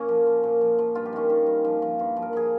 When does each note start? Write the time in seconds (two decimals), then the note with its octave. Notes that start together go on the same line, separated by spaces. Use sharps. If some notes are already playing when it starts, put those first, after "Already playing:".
Already playing: A#2 A#3 C#4
0.09 F3
0.27 F3
0.43 A#2
0.61 F3
0.79 F3
0.95 G2 F4
1.06 G4
1.13 D#3 C#4 F4
1.30 D#3
1.46 G2
1.65 F3
1.82 F3
1.99 G2
2.17 F3
2.22 A#4
2.33 F3 G#4